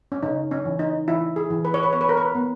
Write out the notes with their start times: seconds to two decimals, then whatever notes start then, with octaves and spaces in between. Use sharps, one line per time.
0.12 C#4
0.23 C#3 D#4
0.51 C#4
0.65 E3
0.79 D#4
1.08 E3 E4
1.36 G#4
1.50 E3
1.65 B4
1.74 C#5
1.83 B4
1.93 B3 C#5
2.01 B4
2.09 A#4
2.17 B4
2.35 B3